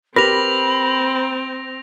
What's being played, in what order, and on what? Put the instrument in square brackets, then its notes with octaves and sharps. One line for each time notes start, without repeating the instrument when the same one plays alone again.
[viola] C4 [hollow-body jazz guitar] G4 A#4 B4 [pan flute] B5 [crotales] A#6 F7